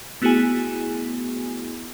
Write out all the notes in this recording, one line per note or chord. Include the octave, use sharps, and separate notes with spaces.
A3 B3 E4 F#4 G#4 G#5